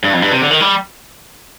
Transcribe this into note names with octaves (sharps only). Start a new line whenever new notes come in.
G2
F2
G2
C3
D3
D#3
G3